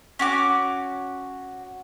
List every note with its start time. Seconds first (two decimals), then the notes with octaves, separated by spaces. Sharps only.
0.19 C#4 F#4 D6